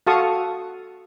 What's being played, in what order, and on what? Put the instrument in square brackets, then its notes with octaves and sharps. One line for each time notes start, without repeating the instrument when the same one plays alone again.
[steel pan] F#4 A4 F5 A5 C#6 D#6